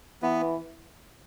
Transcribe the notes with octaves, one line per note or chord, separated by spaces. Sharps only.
E3 B3